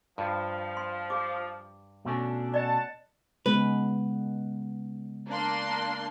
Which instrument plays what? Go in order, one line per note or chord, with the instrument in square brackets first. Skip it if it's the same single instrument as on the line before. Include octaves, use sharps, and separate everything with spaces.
[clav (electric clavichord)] G2 [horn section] F3
[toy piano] C6
G4 D6
[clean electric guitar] B2 A3 C#4 [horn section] D4
[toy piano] D5 D#5 [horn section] F#5 A5
[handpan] C#3 G#3 B3 [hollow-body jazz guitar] B4
[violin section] A#3 D4 C6